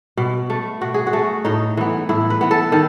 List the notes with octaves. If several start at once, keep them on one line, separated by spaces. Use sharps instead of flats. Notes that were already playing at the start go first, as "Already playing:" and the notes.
B2
A3
B2 F#4
G#4
F#4
A3
A2 D#4
E3 B3
A2 E4
B4
E3 B3
A4
D#3 A4